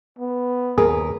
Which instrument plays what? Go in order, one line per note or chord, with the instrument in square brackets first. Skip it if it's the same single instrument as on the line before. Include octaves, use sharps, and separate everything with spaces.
[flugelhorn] B3
[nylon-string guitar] D#2 A#4 B4 [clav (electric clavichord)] G#4